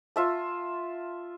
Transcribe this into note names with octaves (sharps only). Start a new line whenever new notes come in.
F4 E5 A5